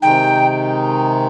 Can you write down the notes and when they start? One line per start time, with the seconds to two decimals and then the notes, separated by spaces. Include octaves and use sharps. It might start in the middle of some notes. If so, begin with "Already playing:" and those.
0.02 C3 D#3 G#3 D#4 G5